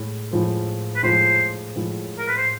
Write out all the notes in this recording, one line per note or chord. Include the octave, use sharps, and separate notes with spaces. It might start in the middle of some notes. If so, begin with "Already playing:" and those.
Already playing: A2 G#3
A2 F3 G#3
B4
A2 F3 G#3 C5
A2 F3 G#3
A#4
B4
C5